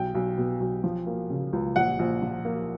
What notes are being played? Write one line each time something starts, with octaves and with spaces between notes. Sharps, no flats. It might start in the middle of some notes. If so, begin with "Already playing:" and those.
Already playing: B1 G5
B1
B2
B1
F3
A#3
C#3
C#2
A#1 F#5
A#1
F3
A#3